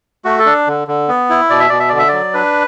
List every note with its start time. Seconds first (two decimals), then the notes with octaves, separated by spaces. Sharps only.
0.25 A3 F#4
0.39 A4
0.46 D4
0.67 D3
0.88 D3
1.08 B3
1.30 E4
1.50 B2 D5
1.60 E5
1.69 B2 D5
1.79 E5
1.89 D3 D5
1.99 E5
2.08 F#3 D5
2.34 D4 B4